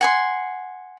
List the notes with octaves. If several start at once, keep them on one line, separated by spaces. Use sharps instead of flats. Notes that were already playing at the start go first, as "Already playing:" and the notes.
F#5 G#5 C6